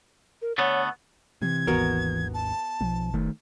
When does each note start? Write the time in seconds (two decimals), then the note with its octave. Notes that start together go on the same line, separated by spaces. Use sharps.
0.42 A#4
0.58 D3 A3 B3 C#5
1.42 C3 E3 G#6
1.67 G#1 D#2 B3 F#4 A#4
2.34 A5
2.81 B1 F3
3.14 F1 D#3 A3